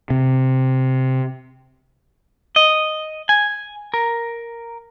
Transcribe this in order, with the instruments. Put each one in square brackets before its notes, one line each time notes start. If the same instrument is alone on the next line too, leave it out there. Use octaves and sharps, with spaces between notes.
[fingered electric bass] C3
[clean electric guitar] D#5
G#5
A#4